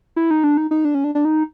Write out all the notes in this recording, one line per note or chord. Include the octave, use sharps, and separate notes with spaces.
E4
D#4
D4
D#4
D#4
D4
C#4
D4
D4
D#4